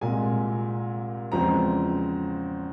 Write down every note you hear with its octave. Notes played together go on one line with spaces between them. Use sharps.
C2 A#2 G#3 G#5
E2 C#3 F3 G#3 C4 A#5